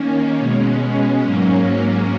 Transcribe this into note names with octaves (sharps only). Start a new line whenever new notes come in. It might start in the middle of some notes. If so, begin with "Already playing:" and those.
Already playing: D#3 A#3 C#4
B2 G#3 C#4
G#2 F#3 A#3 C#4